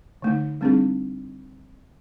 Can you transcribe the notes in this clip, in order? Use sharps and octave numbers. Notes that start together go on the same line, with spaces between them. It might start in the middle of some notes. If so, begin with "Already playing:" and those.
D3 A3 D#4
G3 A3 C4 D4 D#4 G#4